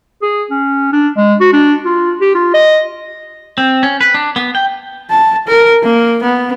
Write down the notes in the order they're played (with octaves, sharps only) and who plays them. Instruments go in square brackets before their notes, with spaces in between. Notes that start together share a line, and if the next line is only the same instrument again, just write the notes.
[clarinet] G#4
C#4
D4
G#3
F#4
D4
F4
G4
F4
D#5
[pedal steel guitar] C4
C#4
B4
D4
B3
G5
[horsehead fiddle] A5
A#4
A#3
B3